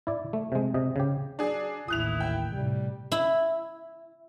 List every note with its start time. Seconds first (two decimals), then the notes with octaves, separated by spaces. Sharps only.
0.07 E4 D5
0.33 A3
0.52 C3 G#3
0.74 C3 D#5
0.96 C#3 G4
1.39 F#3 D4 G#4
1.88 A1 D#2 E4 D#6 F#6 F7
2.20 G5
2.52 A2 C3 G3
3.12 E4